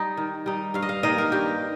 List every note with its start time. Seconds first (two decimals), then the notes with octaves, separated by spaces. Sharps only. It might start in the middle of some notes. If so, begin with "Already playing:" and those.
Already playing: G3 D#4
0.17 D#3
0.46 G3 D#4
0.74 G2 F5
0.82 D#5
0.89 F5
1.03 D#3 A#3 D#4 D#5
1.18 A#4
1.32 G2 G4